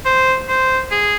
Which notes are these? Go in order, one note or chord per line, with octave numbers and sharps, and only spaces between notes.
C5
C5
G#4